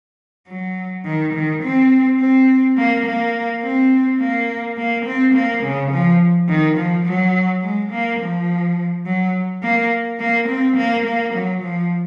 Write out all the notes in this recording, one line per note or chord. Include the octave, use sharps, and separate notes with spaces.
F#3
D#3
D#3
C4
C4
A#3
A#3
C4
A#3
A#3
C4
A#3
C#3
F3
D#3
F3
F#3
G#3
A#3
F3
F#3
A#3
A#3
C4
A#3
A#3
F#3
F3